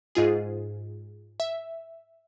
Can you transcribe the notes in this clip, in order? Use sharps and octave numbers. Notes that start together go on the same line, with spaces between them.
G#2 F4 G#4
E5